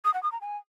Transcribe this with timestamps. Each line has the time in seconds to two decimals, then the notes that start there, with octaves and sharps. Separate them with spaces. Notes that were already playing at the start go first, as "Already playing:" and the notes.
0.05 D#6
0.14 F#5
0.23 D#6
0.32 A#5
0.41 G#5